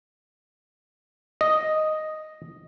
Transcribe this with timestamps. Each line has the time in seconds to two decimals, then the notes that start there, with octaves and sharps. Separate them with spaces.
1.41 D#5